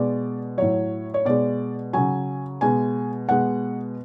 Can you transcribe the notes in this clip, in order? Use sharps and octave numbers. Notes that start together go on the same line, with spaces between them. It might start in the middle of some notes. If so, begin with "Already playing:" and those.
Already playing: B2 G#3 D5
A2 F#3 C#5
C#5
B2 G#3 D5
C#3 F#3 G#5
B2 G#3 G#5
B2 G#3 F#5